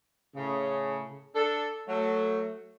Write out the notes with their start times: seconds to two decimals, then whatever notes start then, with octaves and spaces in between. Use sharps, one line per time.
0.36 A2 C#3
1.35 D4 A4
1.88 F#3 A3